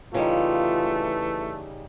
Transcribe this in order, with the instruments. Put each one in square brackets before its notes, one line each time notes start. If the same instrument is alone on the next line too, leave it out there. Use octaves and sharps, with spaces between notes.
[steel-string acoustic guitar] C#3 G3 D#4 [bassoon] E3 [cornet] A3 [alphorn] F4